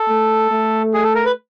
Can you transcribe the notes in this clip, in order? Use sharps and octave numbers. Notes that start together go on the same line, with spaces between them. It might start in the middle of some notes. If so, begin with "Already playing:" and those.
Already playing: A4
A3
A3
G#4
A4
A#4
B4